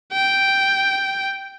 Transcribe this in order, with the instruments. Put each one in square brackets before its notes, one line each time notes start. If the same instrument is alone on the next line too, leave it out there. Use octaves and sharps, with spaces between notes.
[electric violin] G5